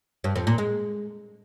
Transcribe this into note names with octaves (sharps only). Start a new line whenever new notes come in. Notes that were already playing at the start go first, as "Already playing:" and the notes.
G2
F2
A#2
G#3